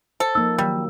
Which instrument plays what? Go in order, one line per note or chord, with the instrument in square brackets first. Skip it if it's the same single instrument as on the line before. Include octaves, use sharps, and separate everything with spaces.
[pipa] A4 [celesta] C5
[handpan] F3 A#3 D#4 [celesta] E6
[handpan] D#3 F#3 [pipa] G3